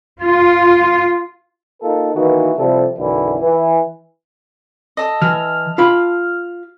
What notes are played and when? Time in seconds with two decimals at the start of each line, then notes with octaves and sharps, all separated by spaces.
0.22 F4
1.82 A#3 D#4 F4 A4 A#4
2.15 D#3 E3 A#3 B3 D#4 F#4
2.58 C3 F3 G3 E4 A4
2.99 B1 F#2 D3 E3 E4
3.41 E3
4.97 A4 D#5
5.22 E3 F6
5.78 F4 B5